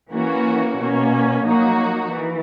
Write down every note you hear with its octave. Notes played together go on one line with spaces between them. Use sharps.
E3 A#3 C#4 F#4
B2 A#3 C#4
F#3 A#3 D#4 F#4
E3